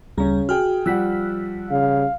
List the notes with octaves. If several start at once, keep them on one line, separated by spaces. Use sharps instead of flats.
D2 C#3 G3 C#4 A#5
F#4 G#4 G5 F6
F3 G3 F#5 E6 F#6 B6
C#3 F5